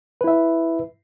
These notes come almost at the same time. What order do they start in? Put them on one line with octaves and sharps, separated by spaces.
B4 E4 E5